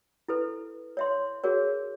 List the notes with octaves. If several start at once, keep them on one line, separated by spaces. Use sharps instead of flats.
E4 A4 B4
C#5 E5 C6
F#4 G#4 A#4 C#5